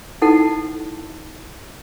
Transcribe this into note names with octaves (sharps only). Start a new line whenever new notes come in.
D#4 E4 A4 F#5 A5